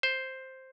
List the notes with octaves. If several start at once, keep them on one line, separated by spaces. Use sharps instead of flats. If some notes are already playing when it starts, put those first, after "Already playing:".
C5